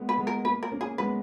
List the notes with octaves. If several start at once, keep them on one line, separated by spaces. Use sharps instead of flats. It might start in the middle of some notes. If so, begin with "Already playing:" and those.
Already playing: G#3 A#3 B3
B4
G#3 B3
A#4
A#3 B4
A#4
A#3 C#4
G#4
G#3 B3 B4